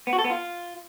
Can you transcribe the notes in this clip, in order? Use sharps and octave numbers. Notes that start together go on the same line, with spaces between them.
B3
F#4
A4
B3
F4